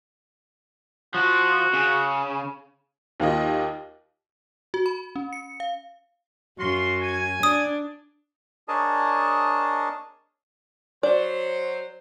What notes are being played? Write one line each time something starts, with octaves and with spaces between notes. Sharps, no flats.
F3 F#4
C#3
D#2 A#3 F4 D#5
F#4
B5
C#4
C#7
F5
F#2 F4 F#4 C6
G#5
D4 D5 D#6
D4 G#4 A#4 C#5 D#5 A5
F#3 C5 D5